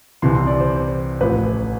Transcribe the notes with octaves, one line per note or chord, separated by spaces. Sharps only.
C2 C3 E3 C6
C6
D5
C5
A1 A2 F3 B4